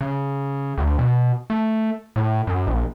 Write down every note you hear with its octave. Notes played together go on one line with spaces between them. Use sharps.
C#3
D2
B2
A3
A2
F#2
A#1